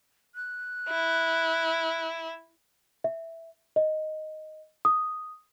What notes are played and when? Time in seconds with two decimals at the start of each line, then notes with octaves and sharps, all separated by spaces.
0.35 F#6
0.90 E4
3.04 E5
3.76 D#5
4.85 D#6